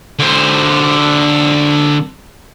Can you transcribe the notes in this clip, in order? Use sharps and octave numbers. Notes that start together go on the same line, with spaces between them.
D3 C5